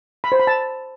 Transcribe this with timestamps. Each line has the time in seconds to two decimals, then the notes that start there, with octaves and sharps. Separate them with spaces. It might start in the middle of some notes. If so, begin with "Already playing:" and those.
0.24 B5
0.32 C5
0.40 B5
0.47 A5